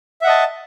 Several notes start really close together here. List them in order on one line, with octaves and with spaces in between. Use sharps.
E5 F#5 D#5 A5